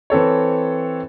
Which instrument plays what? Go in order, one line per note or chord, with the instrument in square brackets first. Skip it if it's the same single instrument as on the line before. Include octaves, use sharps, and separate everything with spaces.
[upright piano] E3 C4 A4 C#5